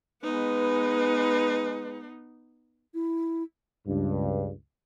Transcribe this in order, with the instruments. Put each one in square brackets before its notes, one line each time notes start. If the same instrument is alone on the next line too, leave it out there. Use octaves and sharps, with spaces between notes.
[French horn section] G#3 B4 [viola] B3 D#4
[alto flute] E4
[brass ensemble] C#2 G2